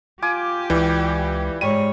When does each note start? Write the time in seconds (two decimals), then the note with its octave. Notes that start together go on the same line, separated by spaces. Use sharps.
0.22 F4 G4 G#5 D6
0.70 C#2 E3 G3
1.61 G#2 G3 C#5 D#7